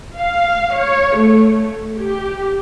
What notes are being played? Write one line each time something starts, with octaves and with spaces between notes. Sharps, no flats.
F5
C#5
A3
G4